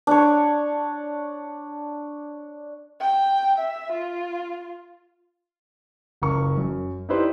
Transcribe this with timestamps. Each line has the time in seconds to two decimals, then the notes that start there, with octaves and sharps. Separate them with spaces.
0.07 D4 C#5
3.01 G5
3.58 E5
3.92 F4
6.22 F#1 C#2 A#4 C#6
6.57 F#2
7.09 D#4 E4 G4 B4 C5 D5